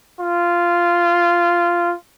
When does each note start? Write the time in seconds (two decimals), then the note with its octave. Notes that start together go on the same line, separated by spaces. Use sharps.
0.20 F4